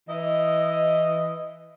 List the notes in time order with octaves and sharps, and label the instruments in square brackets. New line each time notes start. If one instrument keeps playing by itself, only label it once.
[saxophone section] E3 D#5